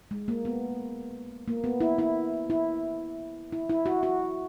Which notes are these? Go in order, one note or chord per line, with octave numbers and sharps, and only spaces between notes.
G#3
A#3
B3
A#3
B3
E4
E4
E4
E4
E4
F#4
F#4